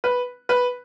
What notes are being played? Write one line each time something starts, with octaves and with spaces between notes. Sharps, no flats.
B4
B4